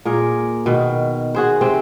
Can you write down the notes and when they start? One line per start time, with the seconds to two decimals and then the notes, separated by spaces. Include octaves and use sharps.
0.05 A#2 G#4 A#4
0.66 B2 D#3
1.34 F#4 G#4 C5
1.61 C3 C4 C5